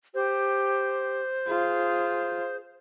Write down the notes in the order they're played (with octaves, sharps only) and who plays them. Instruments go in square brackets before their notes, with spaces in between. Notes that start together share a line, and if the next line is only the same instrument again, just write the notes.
[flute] G4 [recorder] C5
[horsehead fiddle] F4 [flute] G#4